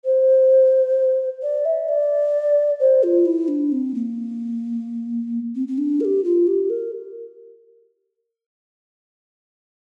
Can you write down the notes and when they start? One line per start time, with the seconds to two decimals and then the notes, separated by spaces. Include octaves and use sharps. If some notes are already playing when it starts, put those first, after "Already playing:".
0.05 C5
1.42 D5
1.65 E5
1.89 D5
2.80 C5
3.03 F4
3.25 E4
3.48 D4
3.72 C4
3.95 A#3
5.55 C4
5.68 C4
5.78 D4
6.01 A#4
6.05 G4
6.24 F4
6.47 G4
6.70 A#4